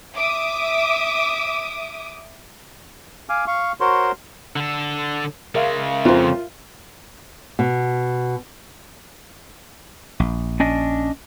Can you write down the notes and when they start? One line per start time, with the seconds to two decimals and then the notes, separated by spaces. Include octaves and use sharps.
0.16 E5 D6 D#6
3.29 F5 G#5 D6 F6
3.47 F5 C#6
3.80 F#4 A#4 C5 C#5 C6
4.56 D3 A4
5.55 C#3 G#3 A#4 E5 F5
6.05 F2 F3 F4
7.59 B2
10.20 A#1
10.60 C#4 D4 D#5